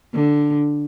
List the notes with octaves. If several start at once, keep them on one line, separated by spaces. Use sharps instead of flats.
D3